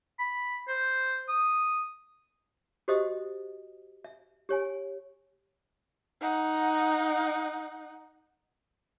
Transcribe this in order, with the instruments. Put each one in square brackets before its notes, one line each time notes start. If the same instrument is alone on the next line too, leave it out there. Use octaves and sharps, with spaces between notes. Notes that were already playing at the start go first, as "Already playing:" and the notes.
[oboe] B5
C5
D#6
[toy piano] F#4 G4 C5 D#5 E5 D#6
E5
G4 C#5 G#5
[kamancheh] D#4 F#5